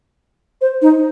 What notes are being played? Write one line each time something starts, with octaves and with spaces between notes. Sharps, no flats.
C5
D#4